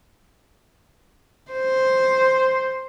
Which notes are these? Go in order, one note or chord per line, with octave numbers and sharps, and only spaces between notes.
C5